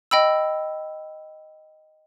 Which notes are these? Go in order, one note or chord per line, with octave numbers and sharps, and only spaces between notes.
D#5 G5 B5 E6